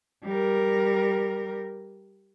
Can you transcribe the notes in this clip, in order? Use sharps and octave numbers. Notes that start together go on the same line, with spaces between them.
G3 A#4